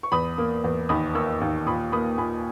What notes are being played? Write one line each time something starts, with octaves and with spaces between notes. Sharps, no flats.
C#6
E2 B5 D#6
A#3
E2
D#2 B5 D#6
A#3 C#6 E6
D#2
A#2 B5 D#6
A#3 B5 D#6
A#2 G#5 B5